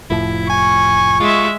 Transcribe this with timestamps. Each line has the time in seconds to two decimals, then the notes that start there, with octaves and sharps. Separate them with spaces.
0.10 F1 A2 F3 E4
0.50 G#5 C#6
1.20 G#3 F4 E5